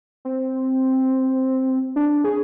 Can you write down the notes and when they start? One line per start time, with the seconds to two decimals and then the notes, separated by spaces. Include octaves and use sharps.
0.25 C4
1.96 D4
2.24 G#4